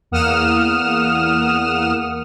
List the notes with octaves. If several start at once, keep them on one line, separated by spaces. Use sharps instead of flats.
E2 A#3 F#5 D#6 F6 E7